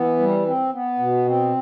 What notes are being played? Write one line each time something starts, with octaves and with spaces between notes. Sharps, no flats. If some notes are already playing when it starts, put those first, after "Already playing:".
Already playing: E3 B3
G3
C4
B3
B2
C4